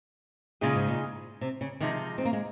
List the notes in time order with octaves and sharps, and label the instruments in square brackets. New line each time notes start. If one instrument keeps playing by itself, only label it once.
[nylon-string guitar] A#2 [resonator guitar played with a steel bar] C#3 G#3 D#4 G#4
[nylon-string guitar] G#2
A#2
C3
C#3
[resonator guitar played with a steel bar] C3 F3 G#3 D#4 [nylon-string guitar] D#3
[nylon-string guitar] C4
A#3
G#3